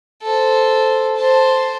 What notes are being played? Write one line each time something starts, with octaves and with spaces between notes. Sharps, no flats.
A4 C5
C5 A5